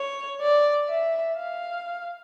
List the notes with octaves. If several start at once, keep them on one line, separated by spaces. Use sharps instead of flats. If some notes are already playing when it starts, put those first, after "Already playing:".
Already playing: C#5
D5
E5
F5